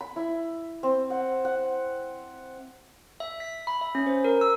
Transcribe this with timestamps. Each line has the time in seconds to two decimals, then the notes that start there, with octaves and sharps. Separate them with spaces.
0.01 B5
0.16 E4
0.83 C4
1.10 F#5
1.45 F#5
3.20 E5
3.40 B6
3.67 B5
3.81 E5
3.95 C#4
4.07 C5
4.24 A#4
4.41 E6